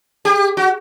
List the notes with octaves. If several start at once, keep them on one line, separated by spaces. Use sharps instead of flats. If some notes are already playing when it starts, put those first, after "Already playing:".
G4
F#4